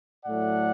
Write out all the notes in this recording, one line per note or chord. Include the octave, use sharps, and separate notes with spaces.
A2 F#3 A3 D5 F#5